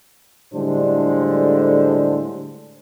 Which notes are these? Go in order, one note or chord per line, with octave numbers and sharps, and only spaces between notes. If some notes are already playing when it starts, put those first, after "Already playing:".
A2 D3 G3 G#3 D4 C5